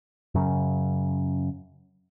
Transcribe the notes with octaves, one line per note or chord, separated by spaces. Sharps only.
F#2 C#3